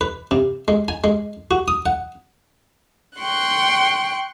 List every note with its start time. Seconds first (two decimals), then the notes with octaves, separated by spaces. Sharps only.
0.01 B4
0.31 C3
0.68 G#3
0.88 G#5
1.04 G#3
1.51 F#4
1.68 D#6
1.86 F#5
3.18 G5 C6 C#6 F#6